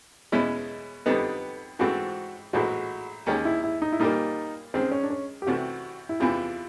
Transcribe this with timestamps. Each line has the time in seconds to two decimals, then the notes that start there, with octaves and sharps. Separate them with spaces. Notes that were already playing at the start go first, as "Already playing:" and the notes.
0.32 E2 B2 G#3 C#4 E4
1.06 F2 D3 G3 B3 D#4 B4
1.79 G#2 E3 A3 C4 F#4
2.53 A#1 A2 E3 G#3 F#4
3.26 D#2 D#3 G#3 C#4
3.45 E4
3.64 E4
3.82 D#4
3.92 E4
3.99 A#2 G3 A#3 D#4
4.74 F#2 D#3 G#3 C4
4.92 C#4
5.03 D4
5.10 C#4
5.42 G4
5.47 C2 C3 E3 A3 F#4
6.09 E4
6.20 E2 C3 E3 F4